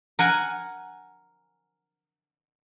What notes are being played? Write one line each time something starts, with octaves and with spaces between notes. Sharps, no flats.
A#4 F#5 G#5